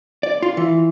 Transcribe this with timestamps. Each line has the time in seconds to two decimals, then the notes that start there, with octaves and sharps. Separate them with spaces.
0.23 D5
0.42 F4
0.57 E3